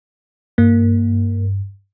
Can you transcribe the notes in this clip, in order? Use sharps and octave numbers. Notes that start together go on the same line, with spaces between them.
G2 A#3